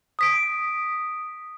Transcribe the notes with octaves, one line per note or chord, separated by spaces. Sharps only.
D#6 B6 D7